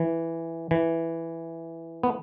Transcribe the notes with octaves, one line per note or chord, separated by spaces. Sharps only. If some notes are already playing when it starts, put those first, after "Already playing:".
Already playing: E3
E3
B3